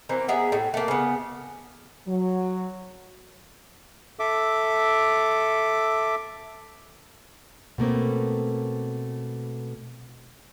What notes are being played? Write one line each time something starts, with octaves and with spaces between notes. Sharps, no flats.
E3 A#3 C4
B3 G#4 E5 A#5
A2
A3 A#3
C#3 B3
F#3
A4 E5 D6
B2 A3 A#3 C4